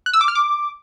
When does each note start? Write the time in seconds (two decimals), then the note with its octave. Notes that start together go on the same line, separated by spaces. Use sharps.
0.06 F#6
0.13 E6
0.21 D6
0.28 F6
0.35 D6